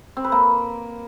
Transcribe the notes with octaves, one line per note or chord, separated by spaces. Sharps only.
C4
B4
A#3